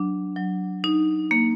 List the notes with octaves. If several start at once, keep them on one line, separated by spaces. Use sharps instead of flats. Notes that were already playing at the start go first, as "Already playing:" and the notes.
Already playing: F#3 D4
F#3
D#4
A#3